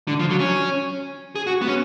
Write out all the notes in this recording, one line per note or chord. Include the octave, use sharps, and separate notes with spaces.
D3
F3
F#3
C#4
G#4
F#4
B3
C#4